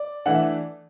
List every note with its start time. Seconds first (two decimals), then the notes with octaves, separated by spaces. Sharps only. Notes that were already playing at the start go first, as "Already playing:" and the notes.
Already playing: D5
0.26 E3 A3 D4 F#5
0.35 E5